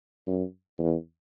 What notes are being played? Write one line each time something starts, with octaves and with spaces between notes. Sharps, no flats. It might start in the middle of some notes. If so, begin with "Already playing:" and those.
F#2
E2